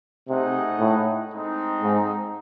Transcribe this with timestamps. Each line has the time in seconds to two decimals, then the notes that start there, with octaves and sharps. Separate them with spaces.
0.28 C3 A3 D#4 G#4 D#5 F#5
0.80 A2
1.31 G#3 C4 D#4 A4
1.82 G#2